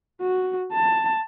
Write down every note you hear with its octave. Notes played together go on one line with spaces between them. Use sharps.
F#4
A5